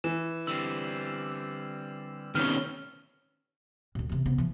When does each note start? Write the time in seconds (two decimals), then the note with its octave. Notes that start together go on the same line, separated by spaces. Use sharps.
0.04 E3 E7
0.47 D3 G3 C4 E6
2.35 A2 C3 D#3 B3 C#4 F6
3.95 D2 A#2
4.10 E2 C3
4.26 C3 B3
4.38 E3 F3